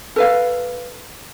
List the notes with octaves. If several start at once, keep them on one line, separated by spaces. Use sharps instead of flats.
A4 B4 F5